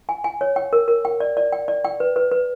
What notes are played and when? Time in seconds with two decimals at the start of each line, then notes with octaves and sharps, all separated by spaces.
0.09 G#5
0.24 G#5
0.41 C#5
0.56 G5
0.73 A#4
0.88 A#4
1.05 G5
1.20 D5
1.37 D5
1.53 G5
1.68 D5
1.84 G5
2.00 B4
2.16 B4
2.31 B4